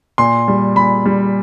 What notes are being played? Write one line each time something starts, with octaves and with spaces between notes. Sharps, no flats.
A#2 C6
G3
A#2 B5
G3